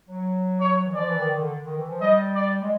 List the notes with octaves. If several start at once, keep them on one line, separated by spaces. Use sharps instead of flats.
F#3
C#5
E3
F3 D5
E3
D#3
D#3
D3
D#3
E3
F3
G3 D#5
D5
G#3